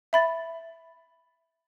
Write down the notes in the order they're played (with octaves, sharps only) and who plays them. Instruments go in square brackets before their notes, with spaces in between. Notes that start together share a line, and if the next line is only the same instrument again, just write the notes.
[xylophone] E5 B5 A6